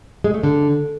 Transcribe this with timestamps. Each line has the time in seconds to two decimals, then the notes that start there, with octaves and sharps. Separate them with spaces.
0.24 G#3
0.34 A3
0.43 D3